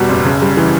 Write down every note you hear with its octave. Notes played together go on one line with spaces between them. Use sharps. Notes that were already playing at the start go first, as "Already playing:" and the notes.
Already playing: E2 B2 G3
F#1
C#3
G3
E3